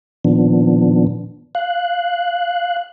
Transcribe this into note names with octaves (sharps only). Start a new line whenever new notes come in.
A#2 D#3 F3 B3 D4
F5 F#6